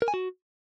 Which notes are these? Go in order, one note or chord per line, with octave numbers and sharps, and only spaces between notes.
A#4
G#5
F#4